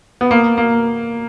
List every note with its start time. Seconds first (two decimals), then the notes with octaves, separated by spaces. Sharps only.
0.21 B3
0.31 A#3
0.58 A#3